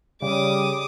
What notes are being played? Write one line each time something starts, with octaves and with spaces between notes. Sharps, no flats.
C#3 G3 D6 D#6